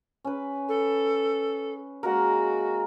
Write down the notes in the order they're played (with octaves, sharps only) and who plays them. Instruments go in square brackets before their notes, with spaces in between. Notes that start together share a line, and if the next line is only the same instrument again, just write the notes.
[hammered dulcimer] C#4 B4
[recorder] A4
[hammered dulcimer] G#3 A#3 A#4 [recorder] F#4